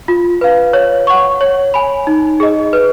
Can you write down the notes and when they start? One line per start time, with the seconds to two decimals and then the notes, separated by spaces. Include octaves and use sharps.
0.08 F4
0.41 B4 F5
0.73 C#5
1.07 F#5 C#6
1.41 C#5
1.74 G#5 B5
2.07 D#4
2.40 G#4 D#5
2.73 B4